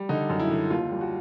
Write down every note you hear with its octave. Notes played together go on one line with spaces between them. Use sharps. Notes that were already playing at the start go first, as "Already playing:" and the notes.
Already playing: G3
D3 D#4
F#2
E4
D3
D#2 F4
G3
F#4